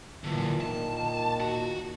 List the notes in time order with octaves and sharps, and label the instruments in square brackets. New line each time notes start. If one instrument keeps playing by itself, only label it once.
[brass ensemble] A#2 E3 [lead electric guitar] D3 F#3
[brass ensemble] A#2 D#3 [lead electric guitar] A5
[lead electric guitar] F#4